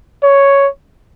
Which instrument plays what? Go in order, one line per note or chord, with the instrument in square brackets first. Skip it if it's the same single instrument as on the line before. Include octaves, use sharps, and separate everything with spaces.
[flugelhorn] C#5